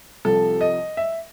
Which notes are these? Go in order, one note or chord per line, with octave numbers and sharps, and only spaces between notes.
C2 C3 F3 A4
D#5
E5